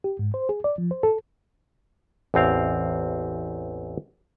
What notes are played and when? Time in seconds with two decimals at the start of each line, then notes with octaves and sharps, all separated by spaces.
0.04 G4
0.19 G#2
0.34 C5
0.49 G#4
0.64 D5
0.78 F3
0.91 C5
1.03 A4
2.34 A1 E2 C4 F5